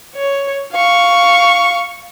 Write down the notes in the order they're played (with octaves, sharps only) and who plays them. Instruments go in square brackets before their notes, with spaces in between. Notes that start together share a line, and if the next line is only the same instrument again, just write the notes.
[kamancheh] C#5
F5 C#6